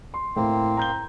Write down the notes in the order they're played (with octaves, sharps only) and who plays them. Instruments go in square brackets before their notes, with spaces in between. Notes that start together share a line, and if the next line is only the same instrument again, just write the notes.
[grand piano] C6
[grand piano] A2 [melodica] A#3 C4
[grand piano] A#5 G6 G7